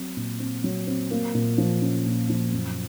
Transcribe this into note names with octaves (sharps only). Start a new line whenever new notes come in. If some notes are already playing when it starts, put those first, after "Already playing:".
Already playing: F#3 C4
A#2
C4
F#3
C4
A#3
A#2
F3
C#4
A#2
F3
F#2